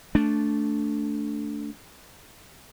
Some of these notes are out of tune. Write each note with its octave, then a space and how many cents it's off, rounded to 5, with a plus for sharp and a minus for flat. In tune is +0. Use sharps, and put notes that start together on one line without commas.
A3 +0 D4 -15